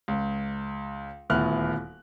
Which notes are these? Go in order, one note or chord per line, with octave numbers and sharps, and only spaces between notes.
C#2
D#1 D2 B3 E4 F6 F#6